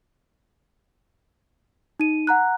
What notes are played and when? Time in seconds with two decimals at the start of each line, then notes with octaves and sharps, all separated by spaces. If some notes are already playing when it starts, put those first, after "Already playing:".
2.00 D#4 D#7
2.27 F#5 A#5 F#6